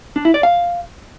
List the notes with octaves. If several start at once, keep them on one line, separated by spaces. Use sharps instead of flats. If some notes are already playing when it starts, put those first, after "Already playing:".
D4
E4
D5
F5